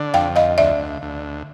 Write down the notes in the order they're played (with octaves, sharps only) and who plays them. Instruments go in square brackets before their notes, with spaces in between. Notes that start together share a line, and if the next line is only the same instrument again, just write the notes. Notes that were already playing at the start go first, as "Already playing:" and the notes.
Already playing: [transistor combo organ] D3
[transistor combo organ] F2 [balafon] F5 G5
[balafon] D#5 F5
[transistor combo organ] D2 [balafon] D5 E5
[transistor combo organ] D2